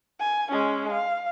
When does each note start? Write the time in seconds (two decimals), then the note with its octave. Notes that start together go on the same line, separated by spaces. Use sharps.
0.20 G#5
0.51 G#3 C#4
0.91 F5